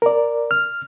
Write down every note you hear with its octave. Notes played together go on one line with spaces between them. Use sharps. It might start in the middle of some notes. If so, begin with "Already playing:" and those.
A#4 D5
F6